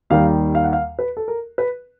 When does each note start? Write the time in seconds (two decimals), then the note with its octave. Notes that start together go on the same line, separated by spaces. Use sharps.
0.10 D#2 D#3 G3 F5
0.55 F5
0.64 F#5
0.73 F5
0.99 B4
1.17 A4
1.28 A#4
1.58 B4